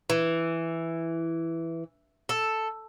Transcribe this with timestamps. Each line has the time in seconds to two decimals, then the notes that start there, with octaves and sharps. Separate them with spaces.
0.10 E3
2.29 A4